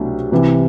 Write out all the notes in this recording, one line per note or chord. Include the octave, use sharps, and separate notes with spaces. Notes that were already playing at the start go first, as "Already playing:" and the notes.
Already playing: C2 B2 F#3 A3 D4
C2 C3 E3